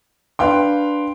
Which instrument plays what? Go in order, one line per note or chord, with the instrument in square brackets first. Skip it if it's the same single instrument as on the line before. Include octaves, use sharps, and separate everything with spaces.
[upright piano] D4 B4 F5 G5 C6